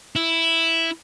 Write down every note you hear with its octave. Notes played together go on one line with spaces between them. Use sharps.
E4